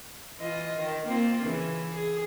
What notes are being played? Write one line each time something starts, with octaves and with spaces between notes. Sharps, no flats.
E3 F4 D#5
D#3
A#3 C4 F4
C#3 E3
G#4